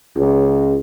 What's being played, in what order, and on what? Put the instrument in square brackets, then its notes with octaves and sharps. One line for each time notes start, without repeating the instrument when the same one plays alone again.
[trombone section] C#2